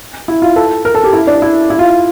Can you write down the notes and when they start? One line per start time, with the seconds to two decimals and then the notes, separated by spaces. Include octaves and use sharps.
0.28 E4
0.42 F4
0.56 A4
0.85 A#4
0.95 A4
1.04 G4
1.13 E4
1.27 D4
1.42 E4
1.70 E4
1.79 F4